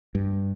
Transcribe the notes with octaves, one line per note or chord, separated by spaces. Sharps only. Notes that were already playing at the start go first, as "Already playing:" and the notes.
G2